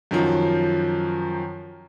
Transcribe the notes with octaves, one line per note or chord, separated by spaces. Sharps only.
F#2 D#3 F3